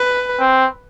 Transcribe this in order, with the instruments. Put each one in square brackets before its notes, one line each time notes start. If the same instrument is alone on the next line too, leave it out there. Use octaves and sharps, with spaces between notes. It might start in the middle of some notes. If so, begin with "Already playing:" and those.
Already playing: [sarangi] B4
[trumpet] C4